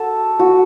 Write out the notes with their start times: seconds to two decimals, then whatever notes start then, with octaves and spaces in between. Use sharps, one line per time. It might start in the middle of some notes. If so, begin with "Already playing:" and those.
Already playing: F#4 A4
0.39 F#4